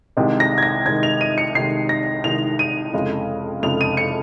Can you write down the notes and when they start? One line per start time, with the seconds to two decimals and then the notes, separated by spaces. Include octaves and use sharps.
0.17 C2 C3 D#3 G#3
0.40 A#6
0.58 G#6
0.63 A#6
0.86 C2 C3 D#3 G#3 G#6
1.03 F7
1.21 D#7
1.38 C#7
1.55 C2 C3 D#3 G#3 C7
1.89 A#6
2.24 C2 C3 D#3 G#3 F7
2.59 D#7
2.94 F1 F2 C#3 G#3
3.62 F1 F2 C#3 G#3 F7
3.81 D#7
3.97 C#7